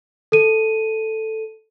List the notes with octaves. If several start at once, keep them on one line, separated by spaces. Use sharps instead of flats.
A4 D#7